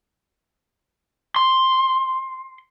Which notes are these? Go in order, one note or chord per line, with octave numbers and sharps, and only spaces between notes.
C6